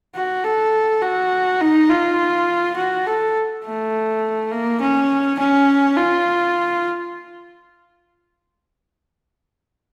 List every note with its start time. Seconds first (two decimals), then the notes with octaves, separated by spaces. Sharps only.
0.16 F#4
0.44 A4
1.02 F#4
1.61 D#4
1.89 F4
2.76 F#4
3.07 A4
3.64 A3
4.52 A#3
4.81 C#4
5.39 C#4
5.97 F4